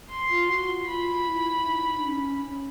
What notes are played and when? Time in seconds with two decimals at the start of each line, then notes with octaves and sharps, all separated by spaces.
0.11 C6
0.30 F4
0.50 F#4
0.69 F4
0.89 F4 B5
1.28 E4
1.66 D#4
1.99 D4
2.06 C#4
2.45 C#4